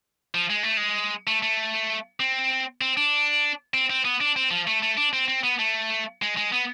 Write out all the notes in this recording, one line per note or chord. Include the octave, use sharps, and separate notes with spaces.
F3
G#3
A3
G#3
A3
A3
C4
C4
D4
C4
C4
B3
D4
C4
F3
A3
A3
D4
C4
C4
B3
A3
G#3
G#3
B3